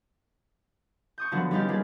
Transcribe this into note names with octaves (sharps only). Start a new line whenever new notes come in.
C#6 D#6 G6
D3 F3 F#3 B3
G3 C#4 D#4 F4 G4
G3 A#3 F4 G#4